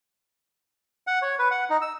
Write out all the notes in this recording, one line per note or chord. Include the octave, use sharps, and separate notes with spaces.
F#5
C#5
B4
F#5
D#4
E6